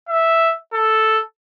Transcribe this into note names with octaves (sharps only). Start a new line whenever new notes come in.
E5
A4